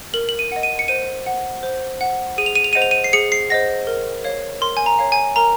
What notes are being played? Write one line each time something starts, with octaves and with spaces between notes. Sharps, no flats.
A#4 F#7
F#7
D#7
D#5 F#5
D#7
C#7
C5 D#7
F#5
C5
F#5
G#4 D#7
F7
D#7
F7
C5 D#5 F#5 D#7
F7
D#7
C7
G#4 C#7
C7
C5 D#5 F#5 A#6
A#4
C#5 F5
A#4 C6
G#5
A#5
C#5 F5
G#5
A#4 A#5